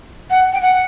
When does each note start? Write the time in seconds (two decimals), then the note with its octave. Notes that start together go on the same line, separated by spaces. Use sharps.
0.30 F#5
0.53 G5
0.62 F#5